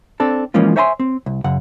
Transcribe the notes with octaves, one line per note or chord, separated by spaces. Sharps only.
C4 D4 A4
E3 F3 G#3 A#3 C#4 F4
C5 C#5 E5 G#5 A5 C6
C4
C2
F#2 C#3 F#5